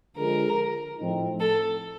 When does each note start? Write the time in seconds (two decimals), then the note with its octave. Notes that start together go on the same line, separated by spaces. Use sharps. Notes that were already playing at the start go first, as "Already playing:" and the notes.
0.16 D3 F3 G#3 A#4
0.98 A2 F3 A3 C4 D#4
1.40 A4